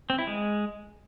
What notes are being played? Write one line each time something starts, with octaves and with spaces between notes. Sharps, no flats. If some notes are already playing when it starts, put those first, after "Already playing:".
C4
E4
G#3